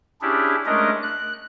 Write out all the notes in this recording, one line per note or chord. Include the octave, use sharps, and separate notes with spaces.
C#4 D4 E4 G4 G#4
G#3 A3 C#4 D4 A#4 D#5
F#6